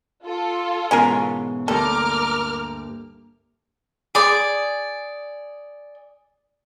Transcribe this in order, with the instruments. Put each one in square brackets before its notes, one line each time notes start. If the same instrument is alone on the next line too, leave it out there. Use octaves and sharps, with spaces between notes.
[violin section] F4 A4
[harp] G#2 B2 E3 [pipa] C#4 G#4 A#4
[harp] D2 G2 A#3 [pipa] A4 [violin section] A#4 D6 F6
[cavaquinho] G#4 D5 D6